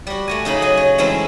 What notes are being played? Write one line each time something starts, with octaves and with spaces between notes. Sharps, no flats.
G3 F#4
A3 F#4 G#5
C#3 D#4 G#4 B5
F#3 G#5
C#5
E3 G#3 A3 C4 C#4 E4